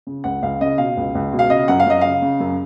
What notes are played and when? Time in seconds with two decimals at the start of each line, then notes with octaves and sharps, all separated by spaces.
0.07 C#3
0.24 C#2 F#5
0.42 C#2 F5
0.61 C#3 D#5
0.78 B2 F5
0.97 C#2
1.15 C#2
1.33 B2
1.39 F5
1.50 C#3 D#5
1.68 F#2 F#5
1.80 F5
1.86 F#2 D#5
2.01 C#3 F5
2.22 C#3
2.40 F#2